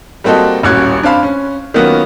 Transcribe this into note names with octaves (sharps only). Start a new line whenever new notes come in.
G3 A#3 C4 F#4 A4 D#5
D#1 A1 C#4 F#4 F#6 G#6
F2 D4 C5 F5 B5
C#4
D#3 F#3 A#3 B3 C#4 F4